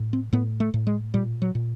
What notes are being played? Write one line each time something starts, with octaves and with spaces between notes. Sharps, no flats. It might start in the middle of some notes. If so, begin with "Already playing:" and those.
Already playing: A2
C4
A2 B3
A3
A2
G#3
A#2 G3
F#3
A#2